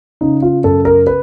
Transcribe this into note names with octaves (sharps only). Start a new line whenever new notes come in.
C#3 D#4
F4
F#2 A4
A#4
B4